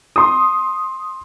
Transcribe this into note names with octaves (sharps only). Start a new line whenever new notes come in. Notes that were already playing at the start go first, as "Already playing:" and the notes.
C6 D#6